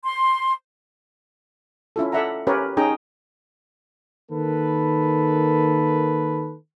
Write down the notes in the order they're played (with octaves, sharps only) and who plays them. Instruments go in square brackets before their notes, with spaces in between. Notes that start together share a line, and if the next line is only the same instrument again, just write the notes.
[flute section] C6
[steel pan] C#4 E4 F4 A4
A4 D5 E5 F#5 A#5
C#4 G4 A#4 B4 C#5
C#4 D#4 G#4 G5 A#5
[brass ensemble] D#3 A#3 A4 B4